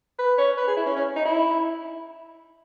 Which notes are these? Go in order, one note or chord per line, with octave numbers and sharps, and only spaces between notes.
B4
C#5
B4
G#4
E4
C#4
C#4
D#4
E4